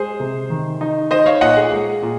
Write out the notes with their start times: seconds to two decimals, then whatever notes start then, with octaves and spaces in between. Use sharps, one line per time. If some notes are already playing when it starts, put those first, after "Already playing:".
Already playing: G#3 G#4 C5
0.20 C3
0.50 D#3
0.81 D#4
1.11 D#4 C5 D#5
1.26 C#5 F5
1.41 A#2 D#5 F#5
1.57 G#4
1.71 G#3 G#4
2.02 A#2